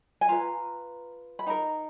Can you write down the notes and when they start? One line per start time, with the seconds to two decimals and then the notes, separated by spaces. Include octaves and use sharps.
0.21 G#5
0.28 F4 B4 A#5
1.39 B5
1.46 D#4 A#4 A#5